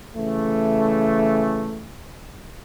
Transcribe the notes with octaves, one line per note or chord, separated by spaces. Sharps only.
C#3 E3 A3